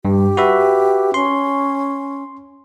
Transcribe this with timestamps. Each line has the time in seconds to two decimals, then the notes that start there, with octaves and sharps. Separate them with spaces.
0.05 G2 G4
0.37 F#4 B4 E5
1.14 C#4 C6